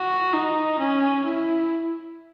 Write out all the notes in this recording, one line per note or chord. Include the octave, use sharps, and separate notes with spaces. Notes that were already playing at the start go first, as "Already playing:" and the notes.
Already playing: F#4
D#4
C#4
E4